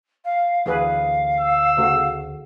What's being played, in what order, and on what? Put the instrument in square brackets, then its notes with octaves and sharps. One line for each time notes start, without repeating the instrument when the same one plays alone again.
[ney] F5
[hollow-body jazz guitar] D2 [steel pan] E3 G#4 B4 [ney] F5
[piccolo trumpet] E6
[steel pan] C#3 A3 F#4